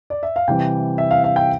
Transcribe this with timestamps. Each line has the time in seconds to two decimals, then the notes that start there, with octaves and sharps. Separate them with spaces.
0.10 D5
0.23 E5
0.36 F5
0.48 C3 E3 G3 C4 G5
0.98 E5
1.11 F5
1.24 F5
1.36 G5